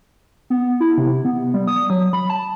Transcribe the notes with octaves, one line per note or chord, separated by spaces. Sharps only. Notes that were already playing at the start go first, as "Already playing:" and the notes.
B3
E4
C3
B3
G3
D#6
F#3
B5
A5